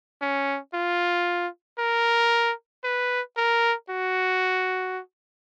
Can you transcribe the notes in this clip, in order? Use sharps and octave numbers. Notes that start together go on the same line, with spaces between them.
C#4
F4
A#4
B4
A#4
F#4